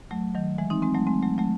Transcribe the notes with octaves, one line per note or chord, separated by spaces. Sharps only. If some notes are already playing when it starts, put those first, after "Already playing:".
F#3 A3
D#3 F#3
E3 G#3
C4 D#4
G#3 C4
F#3 A3
G#3 C4
F#3 A3
F#3 A3